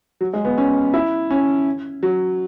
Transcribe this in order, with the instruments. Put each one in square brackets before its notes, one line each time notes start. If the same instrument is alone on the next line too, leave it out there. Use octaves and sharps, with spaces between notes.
[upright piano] F#3
G#3
B3
C#4
E4
C#4
F#3